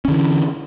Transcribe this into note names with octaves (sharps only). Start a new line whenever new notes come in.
D3 E3 C#4